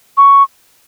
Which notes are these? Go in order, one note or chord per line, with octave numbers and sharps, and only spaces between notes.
C#6